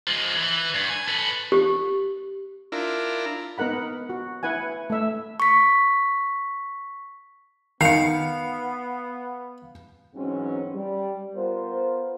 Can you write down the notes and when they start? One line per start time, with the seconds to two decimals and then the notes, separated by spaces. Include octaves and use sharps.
0.08 F3 G#3
0.37 E3
0.74 G2
0.90 G#5
1.08 A4 B4
1.52 G4
2.72 D4 E4 F4 A#4
3.58 B3 D#4 A#4 F#5 B5
4.10 F#4
4.43 E4 B4 F#5 G#5
4.90 A3 E5
5.40 C#6 B6
7.81 D#3 B3 F5 C7 C#7
10.15 G#2 E3 F#3 C4 C#4
10.75 G3
11.36 B3 F4 A#4 C5